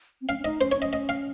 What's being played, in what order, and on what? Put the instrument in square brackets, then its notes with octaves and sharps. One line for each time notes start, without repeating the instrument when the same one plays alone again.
[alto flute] C4
[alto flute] C#4 [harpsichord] F5
[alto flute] C#4
[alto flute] D#4 [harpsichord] D#5
[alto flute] C#4 [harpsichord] C5
[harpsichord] C#5
[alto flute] C#4
[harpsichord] D#5
D#5
F5